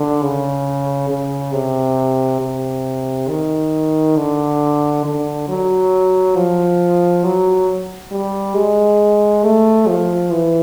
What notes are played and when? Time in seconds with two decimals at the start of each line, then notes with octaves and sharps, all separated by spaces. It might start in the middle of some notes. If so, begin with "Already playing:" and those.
Already playing: D3
0.22 C#3
1.09 C#3
1.54 C3
2.41 C3
3.29 D#3
4.17 D3
5.05 D3
5.48 F#3
6.36 F3
7.24 F#3
8.12 G3
8.55 G#3
9.43 A3
9.88 F3
10.31 E3